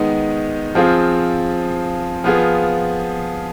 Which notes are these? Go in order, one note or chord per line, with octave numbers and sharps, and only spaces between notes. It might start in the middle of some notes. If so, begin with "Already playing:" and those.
Already playing: D#3 G#3 B3 D#4
F3 C4 F4 G#4
F3 B3 F4 G#4